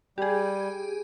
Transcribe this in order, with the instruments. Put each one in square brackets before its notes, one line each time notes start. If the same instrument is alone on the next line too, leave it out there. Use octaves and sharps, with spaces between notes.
[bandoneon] G3 [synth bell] G4 G#4